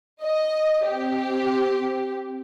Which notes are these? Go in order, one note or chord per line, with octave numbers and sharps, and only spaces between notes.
D#5
C4 G4